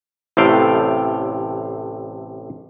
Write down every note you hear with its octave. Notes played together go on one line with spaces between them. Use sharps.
A1 A2 C3 A3 F5 G5